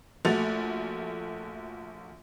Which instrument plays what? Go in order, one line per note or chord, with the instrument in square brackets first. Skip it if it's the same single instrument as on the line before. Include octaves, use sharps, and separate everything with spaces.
[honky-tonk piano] A#1 A3 F#4 A6 F7